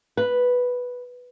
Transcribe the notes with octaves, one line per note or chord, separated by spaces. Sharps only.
B4